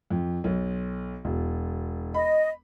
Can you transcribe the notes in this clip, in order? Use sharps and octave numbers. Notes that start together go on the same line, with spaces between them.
F2
B1
E1
D#5 B5